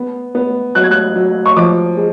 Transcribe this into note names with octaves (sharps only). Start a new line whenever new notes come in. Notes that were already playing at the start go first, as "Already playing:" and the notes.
Already playing: B3
B3
F#3 F#6
G#6
F#6
F#3
C#6
F3 D6
G#3